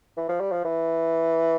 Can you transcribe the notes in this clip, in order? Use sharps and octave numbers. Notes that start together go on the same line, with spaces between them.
E3
F3
G3
F3
E3